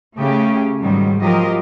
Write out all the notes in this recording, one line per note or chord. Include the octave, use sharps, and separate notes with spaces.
C#3 A3 C#4 G4
G#2 D#3 F#3 G3
F3 F#3 F4 G4 A#4 D#5